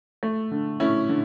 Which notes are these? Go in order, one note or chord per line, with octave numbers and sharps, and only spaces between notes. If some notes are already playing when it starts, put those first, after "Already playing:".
A3
D3
A3 C#4 E4
D3